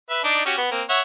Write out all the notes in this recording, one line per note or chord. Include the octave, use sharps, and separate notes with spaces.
B4 E5
D4 D#4 D5
C#4 F#4 G4
B3
A#3 C4
C#5 E5 F#5